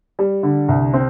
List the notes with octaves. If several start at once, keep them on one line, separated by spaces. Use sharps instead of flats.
G3
D3
C2
C4